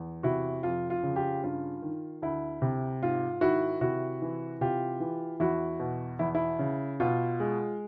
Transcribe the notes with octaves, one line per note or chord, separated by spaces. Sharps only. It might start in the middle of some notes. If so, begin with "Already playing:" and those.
Already playing: E2
C3 E4 F#4
F2 F4
F4
C#3
F4 G4
G2 F4
D#3
D2 E4
C3
G#2 F4
D#3 E4 F#4
C3 E4 F#4
E3
C3 F4 G4
E3
E2 E4 F#4
B2
E2 E4
E4
C#3
B2 F4
G#3